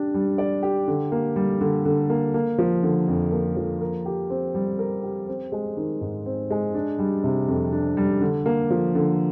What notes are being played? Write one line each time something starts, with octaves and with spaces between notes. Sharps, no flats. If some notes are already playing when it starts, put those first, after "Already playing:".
Already playing: D4 G4
G3
D5
G4
D3
A#3
G3
D3
D3
A#3
A#3
F3
D3
F2
A#3
F3
A#4
G4
C4
G3
A#4
G4
C4
G#3
D#3
G#2
C4
G#3
D4
G3
C3
F2
D4
G3
D3
A#3
F3
D3